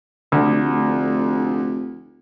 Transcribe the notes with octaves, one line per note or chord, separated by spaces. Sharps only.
F1 D2